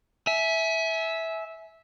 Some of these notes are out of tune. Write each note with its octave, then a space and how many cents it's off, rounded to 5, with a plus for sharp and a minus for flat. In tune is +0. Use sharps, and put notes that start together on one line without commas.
E5 -10 G#5 +30